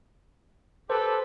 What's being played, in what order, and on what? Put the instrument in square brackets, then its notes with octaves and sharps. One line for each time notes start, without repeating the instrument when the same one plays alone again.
[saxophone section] G4 B4 [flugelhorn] A4 [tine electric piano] C5